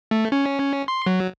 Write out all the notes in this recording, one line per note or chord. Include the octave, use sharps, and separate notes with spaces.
A3
C#4
C6
F#3